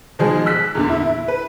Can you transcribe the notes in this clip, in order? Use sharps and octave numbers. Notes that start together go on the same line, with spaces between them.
B2 D#3 F3 G#3 G#4
E6 F#6 B6
E2 A#2 D3
E4
B4